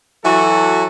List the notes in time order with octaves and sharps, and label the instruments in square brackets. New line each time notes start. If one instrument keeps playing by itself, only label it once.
[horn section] E3 F#3 F#4 A4